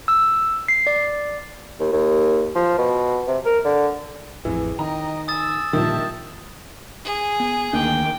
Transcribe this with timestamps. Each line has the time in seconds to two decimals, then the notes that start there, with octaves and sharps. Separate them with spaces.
0.08 E6
0.68 C7
0.87 D5
1.80 D#2
1.92 D#2
2.55 F3
2.79 B2
3.28 C3
3.45 A#4
3.65 D3
4.45 A1 F2 E3 G#4
4.79 D#3 D#5 G5 A#5
5.28 G#5 D#6 E6 A6
5.73 A#2 D3 D#3 F3 G3 E5 A5 D#6
7.05 G#4
7.40 B3
7.73 D2 D#3 A#3 D4 G5 D6